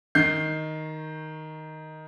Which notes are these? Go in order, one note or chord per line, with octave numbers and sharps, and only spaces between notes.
D#3 G6 C7